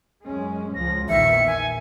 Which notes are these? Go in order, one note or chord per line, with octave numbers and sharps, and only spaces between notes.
F#2 G#3 C#4
C#2 F3 A#6
A#1 E2 D#3 E5 C#7
G#5